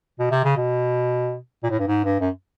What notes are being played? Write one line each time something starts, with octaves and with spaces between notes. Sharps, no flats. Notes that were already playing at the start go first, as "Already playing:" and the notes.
B2
C3
C#3
B2
A#2
A2
G2
G#2
G2
F#2